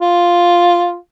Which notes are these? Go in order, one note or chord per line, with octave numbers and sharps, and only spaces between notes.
F4